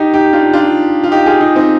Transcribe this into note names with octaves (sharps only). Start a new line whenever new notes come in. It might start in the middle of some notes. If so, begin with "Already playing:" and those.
Already playing: D#4 G4
D#4 G4
D4 F4
D4 F4
F4
D#4 G4
F4 G#4
D#4 G4
C4 D#4